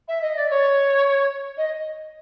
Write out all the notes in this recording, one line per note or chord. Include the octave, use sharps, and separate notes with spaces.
E5
D#5
D5
C#5
D#5